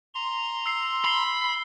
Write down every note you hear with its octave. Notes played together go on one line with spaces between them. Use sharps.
A#5 C6
E6 C7
B5 C7 G7